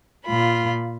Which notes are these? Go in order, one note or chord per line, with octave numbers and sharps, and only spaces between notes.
A#2 F4 B5